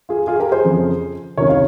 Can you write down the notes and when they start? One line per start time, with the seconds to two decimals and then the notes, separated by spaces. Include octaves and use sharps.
0.09 F4 G#4
0.27 F4 G#4
0.40 G4 A#4
0.51 G#4 C5
0.64 F2 C#3 F3
1.37 C#2 C3 D#3 A#4 C#5
1.49 C#5 F5